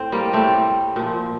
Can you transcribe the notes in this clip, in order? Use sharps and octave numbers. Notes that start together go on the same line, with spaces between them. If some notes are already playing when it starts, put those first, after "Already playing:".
Already playing: A2 C4
G3 A#3
A2 G3 A3 C4
A#2 F3